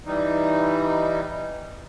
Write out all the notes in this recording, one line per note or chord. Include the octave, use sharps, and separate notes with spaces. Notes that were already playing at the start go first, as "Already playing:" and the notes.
E3 G3 D#4